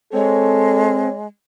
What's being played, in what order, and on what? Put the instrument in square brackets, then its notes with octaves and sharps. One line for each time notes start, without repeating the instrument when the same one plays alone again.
[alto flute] G#3 [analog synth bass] C4 [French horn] A4 [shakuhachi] C#5